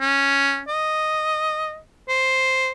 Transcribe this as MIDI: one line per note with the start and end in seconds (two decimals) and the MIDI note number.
0.01 0.61 61
0.68 1.79 75
2.09 2.71 72